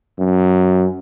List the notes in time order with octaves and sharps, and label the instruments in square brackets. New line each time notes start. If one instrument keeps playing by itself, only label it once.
[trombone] F#2